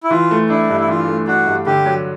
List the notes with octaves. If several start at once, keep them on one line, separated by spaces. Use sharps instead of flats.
E4
E3 F4
A3
D4 E4
G2
E4
E3 F4
A3
D4 F#4
G2
D3 G4
F#3